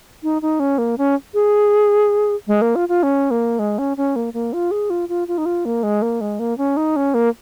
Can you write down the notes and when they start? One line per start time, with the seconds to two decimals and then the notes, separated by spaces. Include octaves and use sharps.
0.23 D#4
0.42 D#4
0.60 C#4
0.78 A#3
0.98 C#4
1.34 G#4
2.47 G#3
2.62 A#3
2.75 F4
2.89 F4
3.03 C#4
3.31 A#3
3.59 G#3
3.78 C#4
3.97 C#4
4.16 A#3
4.34 A#3
4.53 F4
4.71 G#4
4.90 F4
5.09 F4
5.28 F4
5.38 D#4
5.45 F4
5.65 A#3
5.83 G#3
6.02 A#3
6.21 G#3
6.39 A#3
6.58 C#4
6.77 D#4
6.96 C#4
7.14 A#3